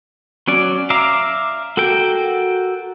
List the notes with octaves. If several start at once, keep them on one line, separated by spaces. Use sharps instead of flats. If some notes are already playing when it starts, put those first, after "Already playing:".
F#3 C#4 D5
E5 F5 A#5 D6
F#4 A4 A#4 G5